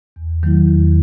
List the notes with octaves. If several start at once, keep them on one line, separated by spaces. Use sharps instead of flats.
E2
D#3 F#3 A3 E4
E2